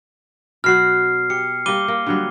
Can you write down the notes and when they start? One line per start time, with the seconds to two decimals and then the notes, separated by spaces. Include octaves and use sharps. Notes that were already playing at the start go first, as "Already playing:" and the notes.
0.64 B2 F#3 F#4 F6 C7
1.30 G4 C#7
1.66 G3 A#3 G4 D6 D#7 G7
1.88 A#3
2.06 D3 F#3 G3